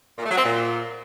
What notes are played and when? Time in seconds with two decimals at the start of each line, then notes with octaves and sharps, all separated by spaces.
0.18 A#2
0.24 A3
0.31 F#3
0.37 C4
0.44 A#2